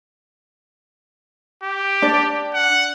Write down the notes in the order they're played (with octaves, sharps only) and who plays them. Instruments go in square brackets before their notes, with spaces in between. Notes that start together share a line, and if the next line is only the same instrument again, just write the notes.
[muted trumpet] G4
[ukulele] D4 D5
[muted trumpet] F#5